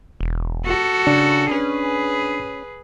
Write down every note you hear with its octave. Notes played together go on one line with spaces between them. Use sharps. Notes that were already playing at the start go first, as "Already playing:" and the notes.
E1
F#4 A4
C#3 D4
C#4 G#4 B4